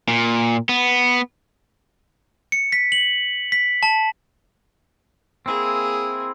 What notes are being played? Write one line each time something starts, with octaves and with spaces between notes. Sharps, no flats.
A#2
B3
C#7
B6
F#7
B6
A5
A#3 C4 E4 G#4